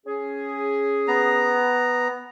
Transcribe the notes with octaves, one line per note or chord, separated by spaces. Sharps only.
C#4 G#4
B3 A#5